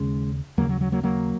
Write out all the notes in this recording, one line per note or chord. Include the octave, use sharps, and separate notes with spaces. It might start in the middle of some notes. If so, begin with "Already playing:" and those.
Already playing: D#2 C#3 G#3 C#4
D#2 C#3 F#3 A#3
F#3
F#3
F#3 A#3
F#3 A#3